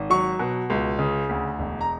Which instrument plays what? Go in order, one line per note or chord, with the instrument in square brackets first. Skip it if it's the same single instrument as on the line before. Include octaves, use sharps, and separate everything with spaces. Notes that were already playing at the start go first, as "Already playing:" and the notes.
Already playing: [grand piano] G#1
F#3 C#6
B2
C#2
C#3
D2
E1
A#5